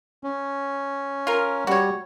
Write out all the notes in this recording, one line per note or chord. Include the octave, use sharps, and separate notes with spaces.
C#4
F4 A#4
G3 F#4 C#5